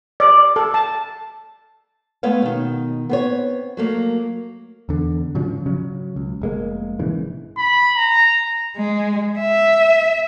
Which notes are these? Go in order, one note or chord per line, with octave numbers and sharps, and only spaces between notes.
D5
A4
A5
G#3 A3 B3 C#5 F5
B2 D#3
B3 C4 C#5
F#3 A3 A#3
E2 D3
G#2 C#3 F3 F#3
C#3 F#3 C#4
C#2
F1 G#3 A#3
A#1 G#2 C#3 E3
B5
A#5
G#3
E5